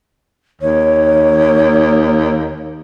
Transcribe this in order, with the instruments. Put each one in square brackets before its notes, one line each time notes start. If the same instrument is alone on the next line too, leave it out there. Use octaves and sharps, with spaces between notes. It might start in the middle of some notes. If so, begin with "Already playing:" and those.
[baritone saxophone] D#2 [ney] C#5